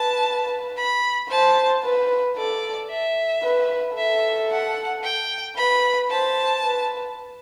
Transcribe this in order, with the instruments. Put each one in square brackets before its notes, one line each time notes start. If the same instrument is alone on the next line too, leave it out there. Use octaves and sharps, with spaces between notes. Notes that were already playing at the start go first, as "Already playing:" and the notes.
Already playing: [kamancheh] B4 [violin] A5
[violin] B5
[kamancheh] C5 [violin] A5
[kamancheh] B4
[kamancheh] A4 [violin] D5
[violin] E5
[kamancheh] B4
[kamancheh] A4 [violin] E5
[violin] F#5
G5
[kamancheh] B4 [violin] B5
[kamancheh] C5 [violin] A5
[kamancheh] B4